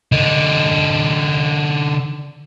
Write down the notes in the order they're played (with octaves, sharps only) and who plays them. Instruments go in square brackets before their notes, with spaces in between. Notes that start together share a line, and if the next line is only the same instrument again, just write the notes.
[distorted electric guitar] D3 D#4